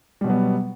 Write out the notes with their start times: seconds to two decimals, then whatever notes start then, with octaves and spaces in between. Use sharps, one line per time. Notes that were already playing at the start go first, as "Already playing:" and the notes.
0.21 G3
0.24 B2
0.27 F#3
0.30 B3